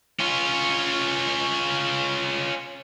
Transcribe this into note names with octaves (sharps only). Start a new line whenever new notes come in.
C#4 F4